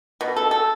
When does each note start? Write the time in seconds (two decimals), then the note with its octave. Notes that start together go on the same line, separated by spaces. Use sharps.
0.21 B2
0.36 A4
0.51 A4